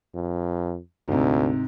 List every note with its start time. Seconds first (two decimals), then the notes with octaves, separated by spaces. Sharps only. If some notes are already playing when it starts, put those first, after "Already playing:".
0.14 F2
1.08 D2 G#2 C3